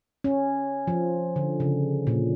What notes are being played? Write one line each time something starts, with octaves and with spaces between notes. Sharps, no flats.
C#4
F3
D3
C#3
A#2